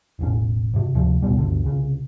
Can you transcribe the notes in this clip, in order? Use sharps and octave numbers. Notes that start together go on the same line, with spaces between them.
E1 A1 C#4
G#2 C3
D2 C3 F3
D#1 B1 B2 G3
G1 D2 D3
C2 C#3